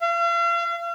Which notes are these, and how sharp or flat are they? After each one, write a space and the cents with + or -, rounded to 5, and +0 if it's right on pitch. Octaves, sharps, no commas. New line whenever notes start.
F5 -40